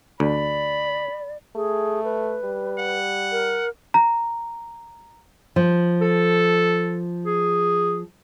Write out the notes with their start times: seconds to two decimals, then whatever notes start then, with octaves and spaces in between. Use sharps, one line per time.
0.20 D2 D5 B5
1.56 A3 G#4
2.04 B4
2.44 G3
2.78 F#5
3.31 A#4
3.94 A#5
5.56 F3
6.01 A4
7.26 G#4